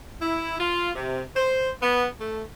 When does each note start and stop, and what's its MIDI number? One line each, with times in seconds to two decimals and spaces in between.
0.21 0.58 64
0.59 0.91 65
0.95 1.21 48
1.35 1.70 72
1.81 2.06 59
2.19 2.42 57